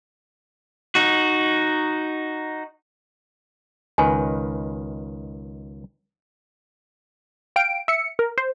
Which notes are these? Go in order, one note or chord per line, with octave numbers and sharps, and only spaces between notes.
D#4 F#4
C#2 D#3 B4 G#5
F5 G5 D7
E5 C#7
A#4
C5